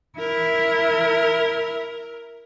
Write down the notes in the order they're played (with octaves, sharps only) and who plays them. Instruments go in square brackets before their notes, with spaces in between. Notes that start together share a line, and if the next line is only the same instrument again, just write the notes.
[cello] E4 [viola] A#4